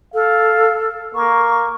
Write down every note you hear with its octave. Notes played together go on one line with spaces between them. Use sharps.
A4 F5
A#3 C#6